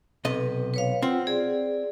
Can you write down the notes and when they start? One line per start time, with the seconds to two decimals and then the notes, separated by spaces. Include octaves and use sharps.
0.25 B1 C3 B4 D#5
0.74 B4 C#5 F5
1.02 C4 F4 F#5 G5
1.27 G#4 D5